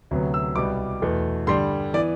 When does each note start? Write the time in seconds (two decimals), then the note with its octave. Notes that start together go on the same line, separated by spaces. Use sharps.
0.11 D2 C3 F#3 B3
0.34 E6
0.56 C2 B2 G3 B3 D6
1.02 E2 B2 A3
1.47 G2 D3 G3 C6
1.94 E3 B3 D5